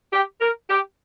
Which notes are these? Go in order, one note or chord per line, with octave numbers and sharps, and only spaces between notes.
G4
A#4
G4